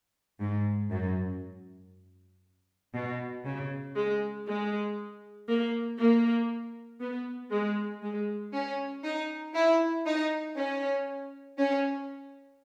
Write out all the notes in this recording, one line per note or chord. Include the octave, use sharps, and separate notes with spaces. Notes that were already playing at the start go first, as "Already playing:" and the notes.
G#2
F#2
B2
C#3
G#3
G#3
A#3
A#3
B3
G#3
G#3
C#4
D#4
E4
D#4
C#4
C#4